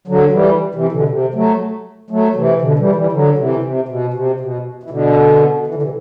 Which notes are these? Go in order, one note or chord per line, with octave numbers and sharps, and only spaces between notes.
D3 F#3
E3 G3
C3 E3
B2 D3
C3
F#3 A3
F#3 A3
C3 E3
B2 D3
E3 G3
E3 G3
D3 F#3
C3 E3
C3
B2
C3
B2
E3
B2 D3
E3
D3
C3 E3